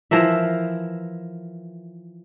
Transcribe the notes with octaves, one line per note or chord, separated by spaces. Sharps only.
E3 F3 A#4 E5